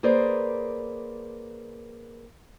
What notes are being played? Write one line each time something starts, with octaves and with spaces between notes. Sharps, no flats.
A#3 G#4 B4 C5 D5